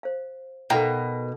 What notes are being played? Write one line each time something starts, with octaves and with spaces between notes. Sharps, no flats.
C5 F5
B2 D#4 A4 A#4 F5 G5